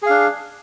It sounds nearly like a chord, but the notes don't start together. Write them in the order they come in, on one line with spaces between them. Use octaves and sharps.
G#4 F5 D4